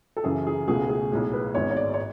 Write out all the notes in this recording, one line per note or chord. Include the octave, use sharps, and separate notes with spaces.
A4
F#2 C#3 E3 G#4
G#4
C#2 B2 A3 G#4
G#4
B1 A2 G#3
B4
G#1 G#2 G#3 B3 C#5
C#5
D5
C#5